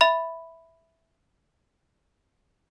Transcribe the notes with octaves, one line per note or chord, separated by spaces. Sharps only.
E5 B5